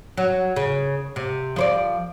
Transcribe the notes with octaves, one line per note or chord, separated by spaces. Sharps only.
F#3
C#3
C3
F3 C5 D5